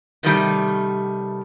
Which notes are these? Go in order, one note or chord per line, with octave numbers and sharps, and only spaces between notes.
C3 D#3 G3 A3